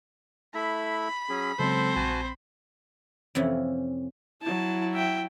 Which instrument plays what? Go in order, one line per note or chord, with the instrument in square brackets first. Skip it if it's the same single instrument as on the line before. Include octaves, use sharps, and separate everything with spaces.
[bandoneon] A3 E4 E5 [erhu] B5
[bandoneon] F#3 C#4 G#4
[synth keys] C#3 F#3 G#3 [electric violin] C4 C5 [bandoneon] A4
[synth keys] A#1 [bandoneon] F#4 G#5 A5
[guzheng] F2 C3 E3 F3 C#4 E4
[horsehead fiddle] F#3 E4 [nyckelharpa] A5
[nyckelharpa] E5 G5